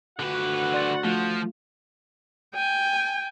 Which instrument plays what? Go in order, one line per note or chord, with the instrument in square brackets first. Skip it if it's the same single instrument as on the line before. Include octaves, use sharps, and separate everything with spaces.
[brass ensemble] D2 F#4 F#5 [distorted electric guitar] D3 B4
[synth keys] D5 C6 A6
[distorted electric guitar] F3 [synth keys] A3 F4
[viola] G5 G#5